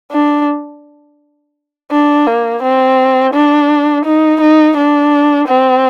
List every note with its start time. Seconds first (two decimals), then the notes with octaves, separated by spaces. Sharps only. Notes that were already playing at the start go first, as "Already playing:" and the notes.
0.12 D4
1.91 D4
2.27 A#3
2.62 C4
3.33 D4
4.06 D#4
4.41 D#4
4.77 D4
5.49 C4